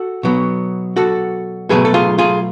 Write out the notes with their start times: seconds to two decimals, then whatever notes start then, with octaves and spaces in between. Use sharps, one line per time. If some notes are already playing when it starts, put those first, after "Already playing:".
Already playing: F#4 A4
0.23 B2 F#3 B3
0.96 F#4 A4
1.69 B2 F#3 A3 G#4 B4
1.85 A4
1.94 F4 G#4
2.18 F4 G#4